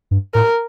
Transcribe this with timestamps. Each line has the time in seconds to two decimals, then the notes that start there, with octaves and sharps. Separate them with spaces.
0.11 G2
0.34 A2 A#4